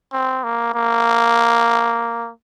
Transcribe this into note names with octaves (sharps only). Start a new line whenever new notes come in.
C4
A#3
A#3